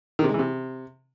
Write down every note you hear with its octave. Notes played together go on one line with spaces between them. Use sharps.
D#3
C3
G#3
E3
C3